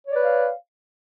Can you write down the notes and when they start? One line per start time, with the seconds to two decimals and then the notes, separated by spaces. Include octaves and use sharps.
0.07 C#5
0.11 D5
0.15 B4
0.19 F5